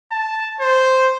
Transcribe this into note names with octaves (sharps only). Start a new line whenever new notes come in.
A5
C5